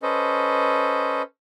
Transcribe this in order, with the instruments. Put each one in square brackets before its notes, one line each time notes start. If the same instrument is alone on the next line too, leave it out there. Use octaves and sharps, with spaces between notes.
[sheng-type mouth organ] C#4 A4 B4 C5 D#5